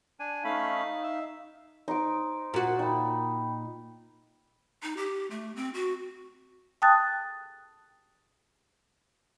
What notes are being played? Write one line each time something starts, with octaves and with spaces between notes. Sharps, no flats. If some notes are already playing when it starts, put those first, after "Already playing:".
D4 G#5
A3 C#4 D#4 F5 B5
E5
D#4 C5 C6 D6
A#2 F#4
D#4 G5 B5
D#4
G4
A3
C4
F#4
G5 A5 D#6 F#6 A6